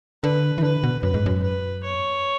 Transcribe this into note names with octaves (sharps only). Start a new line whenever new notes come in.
D3 B4
E3
D3 B4
B2
F#2 B4
G#2
F#2
B4
C#5